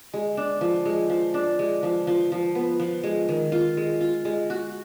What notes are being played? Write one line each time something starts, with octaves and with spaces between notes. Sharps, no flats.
G#3
D4
F3
G#3
F3
D4
G#3
F3
F3
F3
B3
F3
G#3
D#3
F4
G#3
F4
G#3
F#4